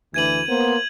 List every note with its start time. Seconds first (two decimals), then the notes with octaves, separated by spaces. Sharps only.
0.14 D2 E3 G#6 D#7 F#7
0.48 A#3 B3 C5